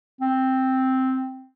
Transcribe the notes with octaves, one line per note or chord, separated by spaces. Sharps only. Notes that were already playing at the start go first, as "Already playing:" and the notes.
C4